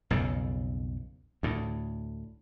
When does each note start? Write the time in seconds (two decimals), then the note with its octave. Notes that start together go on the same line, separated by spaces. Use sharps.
0.11 B1 F2 C#3
1.43 D2 A2